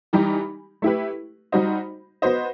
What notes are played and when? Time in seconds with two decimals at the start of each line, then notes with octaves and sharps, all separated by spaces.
0.13 E3 G3 D#4 G4
0.82 A3 E4 G4 B4
1.52 G3 D#4 F#4 C5 D#5
2.22 B3 F#4 C5 D#5